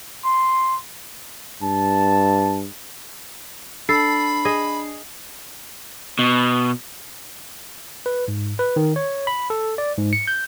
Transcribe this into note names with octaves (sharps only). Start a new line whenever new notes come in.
C6
G2 A5
D4 A4 B5 C7
G#4 D#5
B2
B4
G#2
B4
D#3
C#5
B5
A4
D5
G#2
C#7
G6